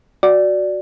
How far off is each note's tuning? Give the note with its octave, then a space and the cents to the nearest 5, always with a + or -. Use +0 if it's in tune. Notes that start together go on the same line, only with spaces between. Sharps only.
F#4 +0 D5 +0